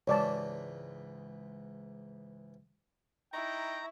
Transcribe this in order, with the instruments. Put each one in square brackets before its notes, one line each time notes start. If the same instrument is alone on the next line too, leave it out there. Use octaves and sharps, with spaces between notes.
[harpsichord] C#2 G#2 E3 [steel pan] C#5 D5 A5
[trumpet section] D#4 G5 [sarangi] E4 [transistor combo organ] A#5 [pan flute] C#6